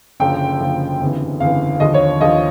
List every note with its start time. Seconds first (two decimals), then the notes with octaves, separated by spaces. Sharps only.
0.20 F#1 F#2 D3 F3 G5
0.60 F#1 F#2 D3 F3
1.01 G1 F2 C#3 E3
1.40 G1 F2 C#3 E3 F5
1.80 D#2 D3 F3 D#5
1.94 C#5
2.21 D#2 D3 F3 D#5